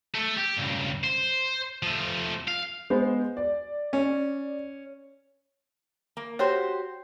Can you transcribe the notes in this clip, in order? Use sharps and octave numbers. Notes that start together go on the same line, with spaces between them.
A3 A4
G4
C#2 G2
C5
F3 A3
F5
G#3 B3 C5
D5
C#4
A#3
F#4 G4 C5 C#5